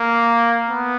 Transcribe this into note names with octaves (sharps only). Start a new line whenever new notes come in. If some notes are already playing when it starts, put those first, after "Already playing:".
Already playing: A#3
B3